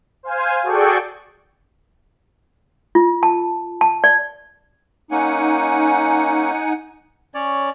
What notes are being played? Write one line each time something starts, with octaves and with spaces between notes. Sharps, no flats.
C5 F5 G#5
F#4 G#4 A4 D5 G5 C#6
F4
A5
A5
D5
A#3 C#4 D#4 F#5 G#5
C#4 C#5 D5